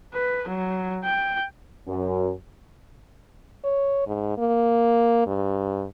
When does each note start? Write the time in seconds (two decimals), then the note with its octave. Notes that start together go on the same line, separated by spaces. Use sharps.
0.14 B4
0.49 F#3
1.05 G5
1.87 F#2
3.64 C#5
4.07 G#2
4.38 A#3
5.27 G2